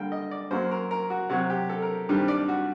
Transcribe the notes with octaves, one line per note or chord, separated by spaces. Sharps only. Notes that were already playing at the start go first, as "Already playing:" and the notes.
Already playing: D3 G3 A#3 G5
D#5
D5
F#2 F#3 A#3 C5
A#4
A#4
F#4
C3 F#3 C4 F#4
G4
A4
A#4
G2 D#3 G3 C4 G4
D5
F#4